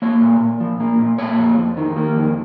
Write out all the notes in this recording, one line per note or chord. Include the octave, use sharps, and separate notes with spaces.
A#3 C#5
A#2
A#2
F3
A#3
A#2
A#3 C#5
F2
F2
D#3
A#3
F2